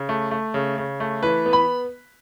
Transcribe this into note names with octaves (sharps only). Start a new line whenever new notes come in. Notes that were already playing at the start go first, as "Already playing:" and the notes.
Already playing: C#3
A3
A3
C#3
C#3
A3
E3 B4
B3
B5